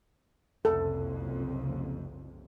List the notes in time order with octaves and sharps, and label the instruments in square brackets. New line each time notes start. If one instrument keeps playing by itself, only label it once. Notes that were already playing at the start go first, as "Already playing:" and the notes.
[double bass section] F#1 C2 F2 [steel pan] A4